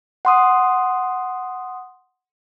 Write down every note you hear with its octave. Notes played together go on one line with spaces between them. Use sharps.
F#5 C6 D#6